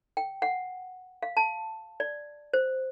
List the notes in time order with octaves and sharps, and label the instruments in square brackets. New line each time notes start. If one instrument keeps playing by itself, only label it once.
[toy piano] G5
F#5
F5
A5
D5
C5